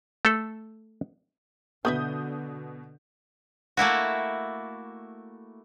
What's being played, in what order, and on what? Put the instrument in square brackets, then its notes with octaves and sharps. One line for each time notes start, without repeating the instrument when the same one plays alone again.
[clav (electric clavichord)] A3 A4
[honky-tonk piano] B2 D#6 G6 [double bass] D3 [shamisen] B3 B4 E5
[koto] A3 A#3 E4 F#4